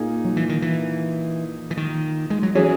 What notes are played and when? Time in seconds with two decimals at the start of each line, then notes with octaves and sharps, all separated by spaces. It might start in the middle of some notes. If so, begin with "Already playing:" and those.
Already playing: A#2 A#3 D#4 G#4
0.25 F#3
0.37 E3
0.49 D#3
0.62 E3
1.71 E3
1.77 D#3
2.30 G#3
2.43 F#3
2.55 E3 F#3 C#4 G#4